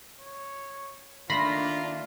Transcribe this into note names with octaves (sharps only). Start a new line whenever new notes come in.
C#5
D#3 A3 A#3 D4 F4 B5 C6 A#6